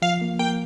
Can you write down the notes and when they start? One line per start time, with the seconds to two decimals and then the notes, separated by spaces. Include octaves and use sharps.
0.02 F3 F5
0.22 A#3
0.39 A#3 G5